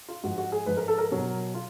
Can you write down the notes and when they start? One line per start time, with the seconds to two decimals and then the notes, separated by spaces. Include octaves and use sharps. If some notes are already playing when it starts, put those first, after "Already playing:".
0.08 F4
0.24 G#2 F3 F#4
0.38 F#4
0.52 G#4
0.66 G#2 F3 B4
0.77 A#4
0.88 A4
0.98 A#4
1.11 B2 F#3
1.54 F4